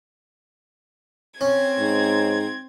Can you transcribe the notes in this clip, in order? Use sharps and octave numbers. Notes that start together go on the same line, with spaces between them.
C4 C#4 G#6
G#2